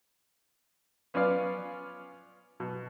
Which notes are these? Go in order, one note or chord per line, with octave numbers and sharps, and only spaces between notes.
B3 C#4 F4 B4 D5 F5
B2